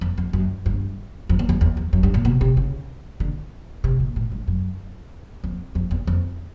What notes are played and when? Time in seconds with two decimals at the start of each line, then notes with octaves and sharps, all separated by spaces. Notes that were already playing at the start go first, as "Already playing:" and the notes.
0.01 F2
0.18 F2
0.33 F#2
0.66 G2
1.29 F2
1.39 E2
1.49 F2
1.61 E2
1.77 F2
1.93 F#2
2.03 G2
2.14 A#2
2.25 B2
2.41 C3
2.57 C#3
3.20 D3
3.84 C3
4.00 A#2
4.16 A2
4.32 G2
4.48 F#2
5.44 F2
5.75 F2
5.91 E2
6.07 F2